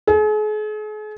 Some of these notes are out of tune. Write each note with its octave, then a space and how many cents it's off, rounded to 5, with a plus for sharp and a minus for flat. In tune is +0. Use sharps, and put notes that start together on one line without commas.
G#4 +40